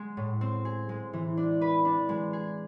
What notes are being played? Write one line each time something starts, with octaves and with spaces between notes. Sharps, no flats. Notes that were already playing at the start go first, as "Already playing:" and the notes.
Already playing: G#3
A2
C4
G#4
G#3
E3
D4
B4
D4
G#3
G#4